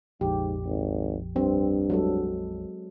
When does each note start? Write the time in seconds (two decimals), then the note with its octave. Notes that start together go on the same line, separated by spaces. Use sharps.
0.21 A#1 F2 G#2 G4
0.66 G#1
1.36 G2 C4
1.90 F#3 G#3 A4